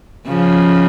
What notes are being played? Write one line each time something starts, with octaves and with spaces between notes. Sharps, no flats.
C#3 F3